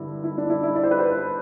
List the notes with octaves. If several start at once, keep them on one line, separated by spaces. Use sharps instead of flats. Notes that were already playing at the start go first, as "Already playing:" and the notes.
Already playing: G2 D3 E4
E4
D4
E4
E4
D5
C5
B4
C5